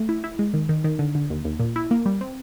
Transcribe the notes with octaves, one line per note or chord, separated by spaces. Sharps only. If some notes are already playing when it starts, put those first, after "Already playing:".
Already playing: A3
E4
E4
G#3
D#3
D#3
D#3
D3
D3
D#2
D#2
A#2
E4
A#3
G3
C4